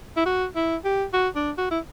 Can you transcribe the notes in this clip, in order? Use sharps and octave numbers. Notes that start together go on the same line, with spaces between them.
E4
F#4
E4
G4
F#4
D4
F#4
E4